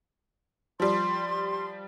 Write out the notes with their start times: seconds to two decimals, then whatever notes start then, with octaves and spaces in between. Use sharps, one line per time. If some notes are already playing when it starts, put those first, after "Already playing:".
0.80 F3 G3 C6